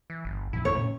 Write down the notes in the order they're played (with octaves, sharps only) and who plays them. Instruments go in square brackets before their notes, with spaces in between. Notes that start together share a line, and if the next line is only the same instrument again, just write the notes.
[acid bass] E3
G1
[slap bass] A#1 F2 E3 [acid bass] E4
[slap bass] G#1 F2 [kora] C#5
[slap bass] A2 C#4